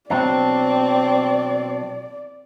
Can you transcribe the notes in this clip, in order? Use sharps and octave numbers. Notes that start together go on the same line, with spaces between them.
B2 F#3 C4 D4 D5